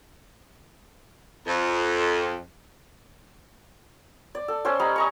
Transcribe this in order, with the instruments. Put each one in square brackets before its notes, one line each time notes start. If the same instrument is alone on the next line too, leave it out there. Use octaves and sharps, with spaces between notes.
[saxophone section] F2
[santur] D5
A4
C#4 A4 C5 G5
G3 D#5 A#5 B5
D#5 A#5 C#6